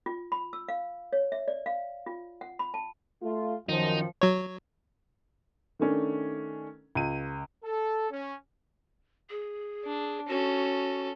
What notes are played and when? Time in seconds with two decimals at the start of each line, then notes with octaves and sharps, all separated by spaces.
0.06 F4
0.32 B5
0.53 E6
0.68 F5
1.13 C#5
1.32 E5
1.48 D5
1.66 F5
2.06 F4
2.41 F#5
2.59 B5
2.74 A5
3.22 A3 F4
3.69 F#2 D#3 F3 D#4
4.22 F#3 C#5
5.79 D#3 A3 C#4 D4
6.95 C#2 D#7
7.64 A4
8.11 C#4
9.30 G#4
9.85 D4
10.28 C#4 F#4 A4